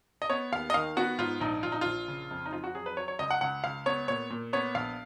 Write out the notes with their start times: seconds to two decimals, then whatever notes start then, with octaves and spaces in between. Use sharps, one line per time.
0.22 D#5
0.30 B3 C#5
0.52 D#2 F5
0.70 D#5
0.74 D#3 F5
0.97 B3 F#4
1.18 G#2 F4
1.40 A#1 D#4
1.63 A#1 F4
1.72 D#4
1.81 A#1 F4
2.08 C#3
2.31 F2
2.46 D#4
2.52 F2 F4
2.64 F#4
2.75 F#3 G#4
2.86 B4
2.97 F#3 C#5
3.08 C#5
3.19 C#2 D#5
3.31 F#5
3.41 C#2 F#5
3.64 C#2 F5
3.86 B3 C#5
4.08 A#2 C#5
4.30 A#2
4.53 B3 C#5
4.75 A#1 F5